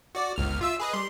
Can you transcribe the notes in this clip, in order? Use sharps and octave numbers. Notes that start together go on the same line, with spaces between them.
F#4 D5
G1 C#2 F6
F4 E5 E6
G#4 B4 D#5
G3 C6